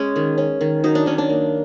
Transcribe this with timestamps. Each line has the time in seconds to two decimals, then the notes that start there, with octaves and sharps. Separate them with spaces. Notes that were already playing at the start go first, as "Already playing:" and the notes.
Already playing: G#3 C#4
0.16 D#3
0.38 C#4
0.61 D#3
0.84 F#3 D#4
0.95 D4
1.06 D#3 C#4
1.18 D4
1.29 A#3